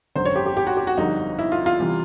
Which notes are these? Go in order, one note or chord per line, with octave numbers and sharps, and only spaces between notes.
G#1 F#2 D3 C5
C#5
G4
G4
G4
F#4
G4
F#4
G1 F2 D3 G3 D#4
E4
F4
F4
C3 E3 G3